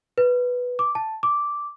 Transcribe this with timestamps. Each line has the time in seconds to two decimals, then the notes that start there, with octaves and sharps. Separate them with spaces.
0.18 B4
0.79 D6
0.95 A5
1.23 D6